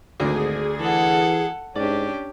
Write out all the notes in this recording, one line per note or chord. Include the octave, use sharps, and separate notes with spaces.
G#1 D2 D3 G#4
E3 A4 F#5
G#2 C#4 D4 G4 D5